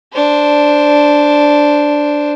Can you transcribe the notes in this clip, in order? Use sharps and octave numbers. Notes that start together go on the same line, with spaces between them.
D4 C5